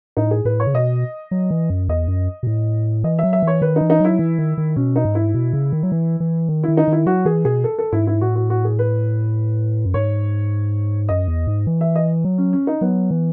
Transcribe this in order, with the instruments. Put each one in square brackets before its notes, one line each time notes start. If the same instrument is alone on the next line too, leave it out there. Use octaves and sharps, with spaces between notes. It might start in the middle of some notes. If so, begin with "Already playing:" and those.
[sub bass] A2 [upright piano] D#4
[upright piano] G#4
[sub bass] A2 [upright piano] B4
[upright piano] C#5
[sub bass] C#3
[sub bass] B2 [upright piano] D#5
[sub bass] F#3
E3
F#2
[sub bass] E2 [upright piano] D#5
[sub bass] F#2
B2
A2
[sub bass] E3 [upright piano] D#5
[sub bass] F#3 [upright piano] E5
[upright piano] E5
[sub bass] E3 [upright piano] C#5
[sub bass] D#3 [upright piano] B4
[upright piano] D#4
[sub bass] E3
[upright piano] D#4
[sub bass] F#3 [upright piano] E4
[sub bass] E3
D#3
D#3
[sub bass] B2 [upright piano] C#4
[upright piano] D#4
[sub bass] G#2
[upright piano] E4
[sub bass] B2
C#3
D#3
F#3
E3
E3
D#3
[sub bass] D#3 [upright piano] E4
[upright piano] D#4
[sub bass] D#3 [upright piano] E4
[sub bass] F#3 [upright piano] F#4
[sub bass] E3 [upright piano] G#4
[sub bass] B2 [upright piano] G#4
[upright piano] A4
A4
[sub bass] G#2 [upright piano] E4
[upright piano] E4
[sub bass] A2 [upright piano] F#4
[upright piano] F#4
F#4
G#4
B4
[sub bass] F#2
[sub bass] G#2 [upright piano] C#5
[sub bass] F#2 [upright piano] D#5
[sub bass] E2
G#2
E3
[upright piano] E5
D#5
[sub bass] F#3
[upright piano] C#4
C#4
D#4
[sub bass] F#3 [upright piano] B3
[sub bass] E3